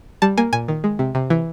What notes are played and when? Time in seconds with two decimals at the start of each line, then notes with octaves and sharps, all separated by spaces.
0.22 G3 A5
0.37 A#3 G#5
0.53 A#2 G#5
0.68 D#3
0.84 G#3
0.99 C3
1.15 C3
1.30 E3